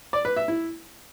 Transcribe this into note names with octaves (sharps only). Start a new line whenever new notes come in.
D5
B4
E5
E4